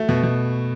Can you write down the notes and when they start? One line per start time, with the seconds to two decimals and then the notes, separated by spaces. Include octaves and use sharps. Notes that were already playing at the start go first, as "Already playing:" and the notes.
Already playing: A3 F#4
0.09 B2
0.23 B2